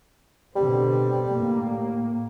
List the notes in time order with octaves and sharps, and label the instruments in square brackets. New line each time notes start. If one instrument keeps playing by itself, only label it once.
[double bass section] B2 D3 C4 [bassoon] G3
[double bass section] A2 A#3